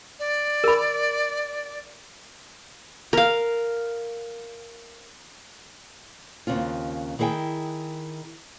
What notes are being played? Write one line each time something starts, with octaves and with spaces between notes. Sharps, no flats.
D5
A#4 B5
A#4 F5
D#2 C#3 C4 F4
D#3 E4 G#4 F#5 G5